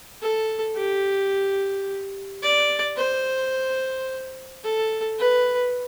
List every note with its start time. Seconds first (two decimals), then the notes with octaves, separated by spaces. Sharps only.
0.22 A4
0.76 G4
2.43 D5
2.97 C5
4.64 A4
5.19 B4